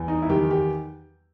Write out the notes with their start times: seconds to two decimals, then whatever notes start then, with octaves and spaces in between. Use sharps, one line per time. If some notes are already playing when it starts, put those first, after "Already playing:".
Already playing: E2
0.08 D#4
0.22 E4
0.29 D#3 G4
0.51 G4